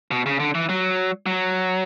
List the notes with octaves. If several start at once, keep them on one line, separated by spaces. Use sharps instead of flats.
B2
C#3
D3
E3
F#3
F#3